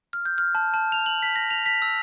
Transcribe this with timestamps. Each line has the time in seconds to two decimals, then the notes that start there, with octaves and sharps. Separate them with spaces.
0.13 F6
0.25 G6
0.38 F6
0.55 A5
0.74 A5
0.92 F7
1.06 F#7
1.23 B6
1.36 A#6
1.51 F7
1.66 B6
1.82 E6